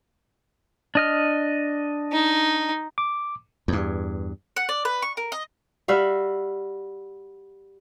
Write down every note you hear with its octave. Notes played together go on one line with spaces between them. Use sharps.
D4 D#5 F6
D#4
D6
E2 G2
F#5
D5
B4
C#6
A#4
D#5
G3 F#4 E5 F5